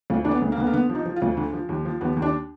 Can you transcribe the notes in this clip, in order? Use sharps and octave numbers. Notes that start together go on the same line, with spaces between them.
D2 F4
D3 D4
B3
D2
A#3
D3 B3
A#3
D3 B3
F3
D#4
F3
F4
D2
D3
F3
D#2
F3
D#2 B3
D#2
D4